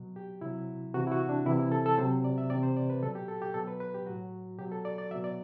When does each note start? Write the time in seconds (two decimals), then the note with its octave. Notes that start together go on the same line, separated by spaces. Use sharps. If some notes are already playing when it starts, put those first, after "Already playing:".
Already playing: B2 F#3
0.16 G4
0.41 C3 F#3 E4
0.94 C3 E3 F#4
1.07 E4
1.12 F#4
1.29 D4
1.46 C3 E3 E4
1.59 E4
1.72 A4
1.86 A4
1.98 C3 F#3 C5
2.24 D5
2.38 E5
2.50 C3 E3 D5
2.63 C5
2.77 D5
2.90 B4
3.02 B2 F#3 A4
3.15 G4
3.28 A4
3.42 G4
3.54 B2 F#3 A4
3.68 B4
3.80 B4
3.94 G4
4.06 A2 F#3 F#4
4.58 B2 F#3 G4
4.72 A4
4.85 D5
4.98 D5
5.11 B2 F#3 E5
5.24 D5